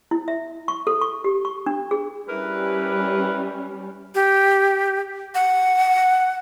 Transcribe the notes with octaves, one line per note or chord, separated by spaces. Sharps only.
E4
E5
C#6
A4
C#6
G4
C#6
D4
G#4
G3 C#4 E4 A#4 B4
G4
F#5